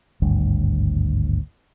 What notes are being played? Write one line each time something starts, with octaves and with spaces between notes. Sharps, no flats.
G#1 D2 G2